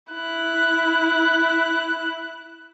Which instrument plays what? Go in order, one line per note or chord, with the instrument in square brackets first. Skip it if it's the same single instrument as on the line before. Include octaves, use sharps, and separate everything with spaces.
[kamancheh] E4 F#6